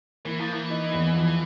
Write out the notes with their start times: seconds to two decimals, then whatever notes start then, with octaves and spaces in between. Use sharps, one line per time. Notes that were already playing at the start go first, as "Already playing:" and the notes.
0.25 E3 A#3
0.39 F3
0.48 E3 A#3
0.70 D#4
0.94 E2
1.15 F3